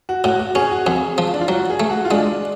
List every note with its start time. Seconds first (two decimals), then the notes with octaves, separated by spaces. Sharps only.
0.09 F#4
0.24 A2 F#4
0.39 F#4
0.55 C#4 G#4
0.71 F#4
0.86 F2 G#4
1.18 F3
1.34 D4
1.41 F4
1.48 F#3 F#4
1.70 G#4
1.80 A3
1.90 F#4
2.05 F4
2.11 G#3 D4